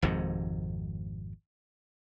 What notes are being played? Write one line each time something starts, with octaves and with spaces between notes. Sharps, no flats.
G#1 F2 G#2 C3